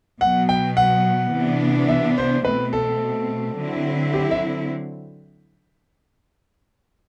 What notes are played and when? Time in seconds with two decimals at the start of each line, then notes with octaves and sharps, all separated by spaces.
0.21 B2 F#3 B3 F#5
0.49 G5
0.77 F#5
1.33 C3 E3 B3 D4
1.89 E5
2.18 C5
2.45 B2 A3 C4 B4
2.73 A4
3.57 D3 F#3 C4 E4
4.13 G4
4.31 E5